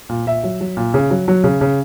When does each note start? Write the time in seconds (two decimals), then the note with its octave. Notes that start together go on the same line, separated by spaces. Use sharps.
0.09 A#2
0.26 A#2 E5
0.43 F#3
0.61 F#3
0.77 A#2
0.94 C#3
1.10 F#3
1.28 F#3
1.44 C#3
1.61 C#3